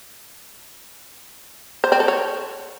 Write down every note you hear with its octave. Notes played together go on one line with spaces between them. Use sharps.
C5
C4
A4
C#5